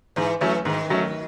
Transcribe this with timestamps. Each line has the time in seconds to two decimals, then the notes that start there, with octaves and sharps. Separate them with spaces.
0.16 G#2 E3
0.41 E3 F#3 A3 C#4
0.65 G#2 D#3
0.90 F#3 A3 C#4